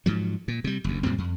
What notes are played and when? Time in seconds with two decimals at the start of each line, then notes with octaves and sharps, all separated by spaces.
0.06 G#2 F3 F#3
0.48 A#2
0.64 C3 G3
0.84 F#1 D2
1.03 F#2 A#2 G3 C4
1.18 F2